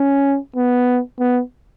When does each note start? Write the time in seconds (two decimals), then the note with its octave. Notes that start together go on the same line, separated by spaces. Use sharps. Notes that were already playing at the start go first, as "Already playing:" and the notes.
Already playing: C#4
0.56 B3
1.19 B3